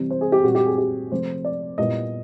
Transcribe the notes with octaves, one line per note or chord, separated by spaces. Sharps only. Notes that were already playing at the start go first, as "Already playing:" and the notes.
Already playing: C3 E3 G3 C4
C5
G#4
G4
A#2 G3 C4 F#4
G4
G#4
G4
C3 F3 A3 C5
D5
A#2 G3 B3 E4 D#5